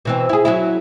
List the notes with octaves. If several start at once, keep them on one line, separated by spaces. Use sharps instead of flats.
B2 E3 C4
E4 G#4
F#3 C#4 E4